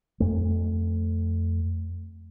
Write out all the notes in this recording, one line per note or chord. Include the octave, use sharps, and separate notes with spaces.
F2 A3